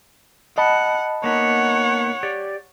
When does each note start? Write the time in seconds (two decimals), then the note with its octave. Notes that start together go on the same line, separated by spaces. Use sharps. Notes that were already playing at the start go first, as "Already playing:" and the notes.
0.58 D#5 F#5 A5 B5
1.24 A#3 B3 D#4 C#5 F#5
2.23 G4 C#5 D5